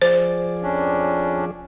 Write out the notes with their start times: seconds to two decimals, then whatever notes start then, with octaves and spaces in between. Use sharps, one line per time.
0.02 F3 G#4 C5 D5
0.63 F2 C#4 D4